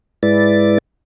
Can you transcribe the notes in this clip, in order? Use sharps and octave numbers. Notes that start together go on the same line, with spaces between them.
G#2 G#3 E4 B4 D5 A6